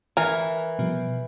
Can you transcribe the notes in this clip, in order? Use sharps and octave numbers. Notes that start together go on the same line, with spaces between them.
E3 A#4 G#5
B2 F3 G3